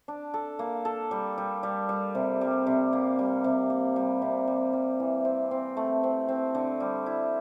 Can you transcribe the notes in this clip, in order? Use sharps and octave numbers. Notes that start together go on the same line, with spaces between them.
D4
A4
A#3
A4
G3
G3
G3
G3
C3
G3
C3
A#3
G3
C3
A#3
G3
C3
G3
G3
E3
C4
C4
A3
C4
C4
D3
G3
E4